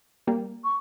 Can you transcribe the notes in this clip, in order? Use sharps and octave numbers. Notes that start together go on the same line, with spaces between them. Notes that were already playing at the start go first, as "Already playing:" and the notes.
G3 A#3
C#6